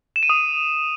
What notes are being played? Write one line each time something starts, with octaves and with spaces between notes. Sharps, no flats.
E7
D#7
D#6